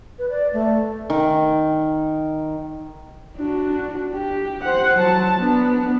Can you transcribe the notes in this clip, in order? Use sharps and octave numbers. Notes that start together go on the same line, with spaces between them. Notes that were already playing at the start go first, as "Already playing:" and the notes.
B4
D5
A3
D#3
D4 F#4
G4
C5 F#5
F#3 A5
B3 D4